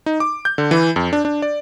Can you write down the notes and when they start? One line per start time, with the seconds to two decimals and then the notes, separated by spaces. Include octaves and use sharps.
0.06 D#4
0.20 D6
0.45 G6
0.58 D3
0.71 E3
0.96 F2
1.13 D4
1.25 D4
1.42 D5